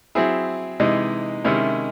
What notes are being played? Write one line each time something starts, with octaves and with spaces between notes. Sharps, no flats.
F#3 C4 E4 G#4
C3 E3 G#3 D#4
C3 D#3 G#3 C#4 E4